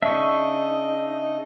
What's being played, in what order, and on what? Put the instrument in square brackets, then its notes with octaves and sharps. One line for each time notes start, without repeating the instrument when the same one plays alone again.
[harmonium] C#3 D#5 [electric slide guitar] D4 D#4 [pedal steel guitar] E5 C#6